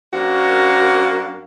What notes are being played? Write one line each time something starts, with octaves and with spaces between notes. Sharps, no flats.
F#2 A#3 C4 D4 F#4 F5